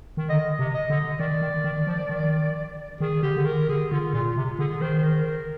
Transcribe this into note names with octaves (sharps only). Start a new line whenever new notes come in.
D#3
D3 D#5
C3
D#5
D3
D#3 D5
D#3
D#3
F3
D#3
D#3 G#4
D3 G4
D3
D#3 A#4
D3 G#4
D3 F4
A#2 F4
C3
D3 G#4
D#3 C5
C5
A#4
A#4